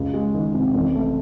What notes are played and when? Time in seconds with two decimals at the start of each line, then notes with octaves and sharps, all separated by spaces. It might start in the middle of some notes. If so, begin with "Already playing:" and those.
Already playing: C#2
0.14 G#3
0.34 D#3
0.54 C3
0.74 A1
0.95 A3